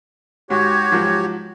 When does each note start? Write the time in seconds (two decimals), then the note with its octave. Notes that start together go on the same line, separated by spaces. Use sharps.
0.50 G#2 F#4 G4 C#5
0.91 G#2 F3 F#3